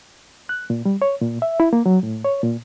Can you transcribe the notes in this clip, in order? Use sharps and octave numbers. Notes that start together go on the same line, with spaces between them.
F#6
A#2
G3
C#5
A#2
E5
E4
A#3
F#3
A2
C#5
A#2